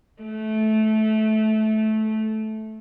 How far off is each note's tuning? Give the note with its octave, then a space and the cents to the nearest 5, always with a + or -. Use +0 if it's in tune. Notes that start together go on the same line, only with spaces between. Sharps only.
A3 -15